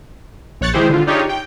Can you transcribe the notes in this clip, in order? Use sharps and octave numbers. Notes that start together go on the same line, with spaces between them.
A#1 C#5 F#6 A6 C#7
D#3 G#3 E4 G4 G#4 C5
D3 F4
D4 D#4 F4 G4 G#4 C#5
G5